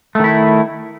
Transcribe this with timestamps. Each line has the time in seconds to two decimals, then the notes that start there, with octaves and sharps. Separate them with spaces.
0.15 A3
0.20 D#3
0.24 E4